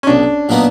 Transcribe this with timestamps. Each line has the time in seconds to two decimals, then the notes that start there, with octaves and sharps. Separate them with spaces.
0.03 C#4
0.07 B1 D4
0.49 A#2 F#3 B3 D#4